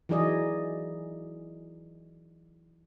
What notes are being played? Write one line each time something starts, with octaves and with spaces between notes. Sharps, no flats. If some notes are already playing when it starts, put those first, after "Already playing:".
E3 F#3 D#4 G#4 D5 D#5